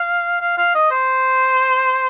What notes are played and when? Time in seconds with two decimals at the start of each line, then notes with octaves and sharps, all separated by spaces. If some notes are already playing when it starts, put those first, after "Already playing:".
Already playing: F5
0.41 F5
0.57 F5
0.74 D#5
0.91 C5